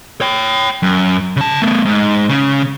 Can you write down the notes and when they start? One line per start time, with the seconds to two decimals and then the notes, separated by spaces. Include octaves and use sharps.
0.21 C#5 G5
0.83 F#2
1.37 C#3 A5
1.62 A3 B3
1.85 G#2
2.29 C#3